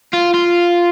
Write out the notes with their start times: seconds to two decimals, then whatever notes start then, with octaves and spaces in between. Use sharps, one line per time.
0.14 F4
0.34 F4